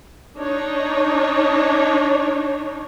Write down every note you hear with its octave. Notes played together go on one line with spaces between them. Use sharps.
D4 D#4 C#5